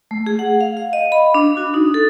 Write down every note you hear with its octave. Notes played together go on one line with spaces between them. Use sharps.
A3
G#4
F#5
F5
F5
D#5
B5
D4
F#4
D#4
A4